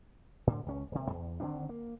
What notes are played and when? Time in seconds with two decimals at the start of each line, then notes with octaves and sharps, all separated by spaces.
0.47 A2 D3
0.66 C#2 C#4
0.92 D#1 C3
1.10 E2
1.40 D3 D#3 C4 D4
1.69 A#3